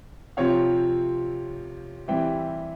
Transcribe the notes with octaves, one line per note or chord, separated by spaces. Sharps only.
C3 F3 C4 F4 C#5 F5
E3 G3 C4 E4 E5 G5